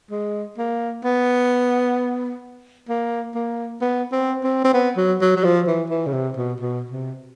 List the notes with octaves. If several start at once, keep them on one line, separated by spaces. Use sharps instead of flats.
G#3
A#3
B3
A#3
A#3
B3
C4
C4
C4
B3
F#3
F#3
F#3
F3
E3
E3
C#3
C3
B2
B2
C3